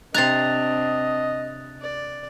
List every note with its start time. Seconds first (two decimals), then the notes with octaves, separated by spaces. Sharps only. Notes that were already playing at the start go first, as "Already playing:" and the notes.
0.14 C3 C4 D4 D#5 A#5 F#6 A6 F7
1.82 D5